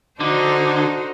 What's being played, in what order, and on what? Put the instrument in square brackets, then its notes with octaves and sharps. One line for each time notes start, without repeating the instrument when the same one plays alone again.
[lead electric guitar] D3 [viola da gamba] D4 D#4 A4 [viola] F#4 C5